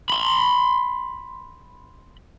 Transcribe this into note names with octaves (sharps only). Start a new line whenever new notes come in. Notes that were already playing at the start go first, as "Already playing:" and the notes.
B5 C6